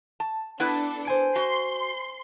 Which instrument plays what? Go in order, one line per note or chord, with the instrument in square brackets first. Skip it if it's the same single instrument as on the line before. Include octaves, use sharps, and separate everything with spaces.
[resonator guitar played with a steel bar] A5
[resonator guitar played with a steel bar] B3 E4 B4 [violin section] D4 A4
[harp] C5 G#5 D7
[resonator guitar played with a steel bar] F#4 [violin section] C6